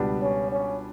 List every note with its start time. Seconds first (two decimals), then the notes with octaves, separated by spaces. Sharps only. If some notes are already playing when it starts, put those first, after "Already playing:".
Already playing: C#2 B2 G3 B3 D4
0.22 C#4
0.52 C#4